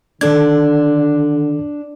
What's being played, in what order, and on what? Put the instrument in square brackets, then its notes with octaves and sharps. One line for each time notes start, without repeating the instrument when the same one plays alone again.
[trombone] D3 [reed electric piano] D#3 A4 G#6 [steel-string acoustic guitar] D4